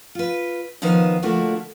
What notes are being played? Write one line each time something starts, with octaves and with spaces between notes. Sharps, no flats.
F4 B4
D#2 F3 B3 D#4 C5
D3 F3 A3 A#3 D4 F#4